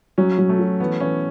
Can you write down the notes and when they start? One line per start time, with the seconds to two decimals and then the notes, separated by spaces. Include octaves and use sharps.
0.18 F#3 C#4
0.38 F#3
0.49 A3
0.59 F#4
0.80 E3 B3
1.00 E3 C#4